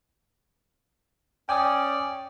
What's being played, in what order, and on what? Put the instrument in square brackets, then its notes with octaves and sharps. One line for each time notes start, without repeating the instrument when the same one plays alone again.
[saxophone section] C#4 D5 [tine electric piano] G5 G#5 D#6